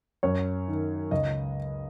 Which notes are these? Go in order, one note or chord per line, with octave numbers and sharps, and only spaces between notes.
F#2 C#5
D#3
C#2 D#5